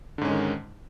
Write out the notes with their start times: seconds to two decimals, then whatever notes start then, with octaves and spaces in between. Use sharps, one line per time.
0.18 D3
0.21 G#2
0.25 C#4
0.28 G#3
0.31 D#3